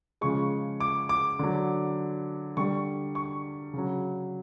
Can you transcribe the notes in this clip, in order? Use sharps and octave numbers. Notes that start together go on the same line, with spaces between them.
C#3 F3 G#3 C#6
D6
D6
D3 F#3
D3 G3 C#6
C#6
C#3 F#3